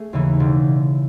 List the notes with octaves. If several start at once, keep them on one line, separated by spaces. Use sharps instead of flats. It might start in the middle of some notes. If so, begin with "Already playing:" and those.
Already playing: A3 G#4
D#2 C#3 E3
E1